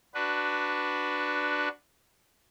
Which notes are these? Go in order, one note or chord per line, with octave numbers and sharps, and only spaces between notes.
D4 F#4 B4